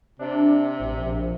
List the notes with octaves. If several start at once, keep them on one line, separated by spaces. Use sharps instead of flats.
C3 D4
A1
A#1